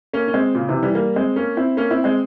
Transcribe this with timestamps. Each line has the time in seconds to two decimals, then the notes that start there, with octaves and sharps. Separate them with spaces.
0.14 A#3 C#4
0.28 C#4
0.34 G#3 C4
0.55 A#2 C#3
0.69 C3 E3
0.83 E3 G3
0.95 G3 A#3
1.16 G#3 C4
1.36 A#3 C#4
1.57 C4 E4
1.77 A#3 C#4
1.90 C4 E4
2.04 G#3 C4